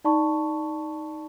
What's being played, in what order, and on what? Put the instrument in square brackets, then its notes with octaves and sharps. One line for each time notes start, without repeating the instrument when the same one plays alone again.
[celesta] D#4 D5 A5 B5 C#6